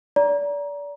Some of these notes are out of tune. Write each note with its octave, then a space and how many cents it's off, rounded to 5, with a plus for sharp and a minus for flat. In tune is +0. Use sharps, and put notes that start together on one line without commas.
D5 -30 A#5 +20